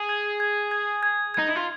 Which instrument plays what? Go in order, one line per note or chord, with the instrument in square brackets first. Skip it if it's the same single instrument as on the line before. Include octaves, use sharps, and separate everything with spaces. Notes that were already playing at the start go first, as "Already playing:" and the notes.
Already playing: [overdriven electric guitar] G#4
[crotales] G#6
G#6
G#6
G#6
[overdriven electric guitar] D#4 [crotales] G#6
[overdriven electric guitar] E4
F4